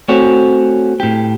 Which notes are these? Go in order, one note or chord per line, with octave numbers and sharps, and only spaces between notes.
A3 C4 C#4 F#4 C#5
A2 G4